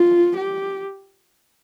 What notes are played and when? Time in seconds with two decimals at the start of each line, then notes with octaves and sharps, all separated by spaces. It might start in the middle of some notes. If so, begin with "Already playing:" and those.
Already playing: F4
0.37 G4